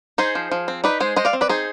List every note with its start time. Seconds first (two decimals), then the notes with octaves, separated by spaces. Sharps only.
0.18 D#4 G#4 C5
0.35 F3
0.52 F3
0.68 C4
0.84 D#4 B4 D5
1.00 G#3 G#4 C5
1.16 G#3 C5 D#5
1.25 D5 F5
1.33 C4
1.41 B4 D5
1.49 D#4 G#4 C5